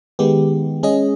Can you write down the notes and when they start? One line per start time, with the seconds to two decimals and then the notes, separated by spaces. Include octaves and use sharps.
0.19 D#3 G#3 B3 G4
0.83 G#3 C#4 G#4 D#5